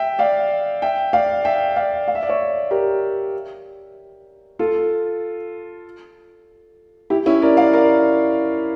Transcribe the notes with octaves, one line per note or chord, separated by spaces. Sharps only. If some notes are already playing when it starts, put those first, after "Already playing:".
Already playing: E5 G5
D5 F5
E5 G5
D5 F5
E5 G5
D5 F5
F5
E5
D5
C#5 E5
G4 A#4
F4 A4
E4 G4
C#4 E4
A#4 D5
D5 F5
A#4 D5